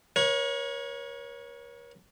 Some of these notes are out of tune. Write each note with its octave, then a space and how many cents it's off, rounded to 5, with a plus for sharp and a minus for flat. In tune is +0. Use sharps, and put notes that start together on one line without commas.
A#4 +45 C#5 -5